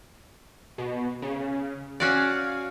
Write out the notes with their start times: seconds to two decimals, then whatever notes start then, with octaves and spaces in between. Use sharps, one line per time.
0.78 B2
1.22 C#3
2.00 C#4 F#4 D5 F5 G#5